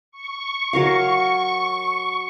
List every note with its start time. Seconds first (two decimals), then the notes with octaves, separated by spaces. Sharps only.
0.11 C#6
0.73 F#3 A#4 F5